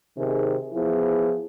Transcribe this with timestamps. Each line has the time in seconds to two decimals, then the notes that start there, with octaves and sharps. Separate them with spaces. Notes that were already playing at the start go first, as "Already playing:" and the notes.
0.17 C3 D#3 G#4
0.73 F3 B3 E4 G#4